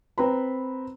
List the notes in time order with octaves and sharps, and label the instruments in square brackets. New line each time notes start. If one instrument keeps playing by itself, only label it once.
[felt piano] C4 B4 A#5 B5